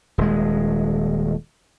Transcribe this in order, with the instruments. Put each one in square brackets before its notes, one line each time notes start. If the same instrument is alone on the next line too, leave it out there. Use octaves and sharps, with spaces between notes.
[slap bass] D#1 G#3